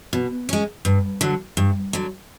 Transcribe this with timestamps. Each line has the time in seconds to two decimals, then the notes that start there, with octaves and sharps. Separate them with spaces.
0.13 B2
0.49 G#3 C#4
0.85 G2
1.21 D3 F#3
1.57 G2
1.93 D3 F#3